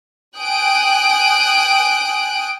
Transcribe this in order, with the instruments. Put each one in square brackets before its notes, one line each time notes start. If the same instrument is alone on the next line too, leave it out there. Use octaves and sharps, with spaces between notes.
[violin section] G5 G#5 D#6 F#6 D7